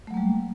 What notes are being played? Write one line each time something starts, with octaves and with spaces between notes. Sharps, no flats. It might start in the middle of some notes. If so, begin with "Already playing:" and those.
F#3 G3 A3 A#3